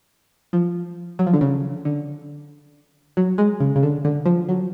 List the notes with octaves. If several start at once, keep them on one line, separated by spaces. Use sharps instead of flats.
F3
F#3
F3
D3
C#3
D3
F#3
G#3
C#3
C#3
D3
D3
F3
F#3